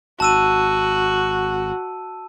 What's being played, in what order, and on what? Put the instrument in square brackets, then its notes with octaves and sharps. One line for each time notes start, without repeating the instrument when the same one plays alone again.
[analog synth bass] G#1 [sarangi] F#4 [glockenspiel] A5 E6 D#7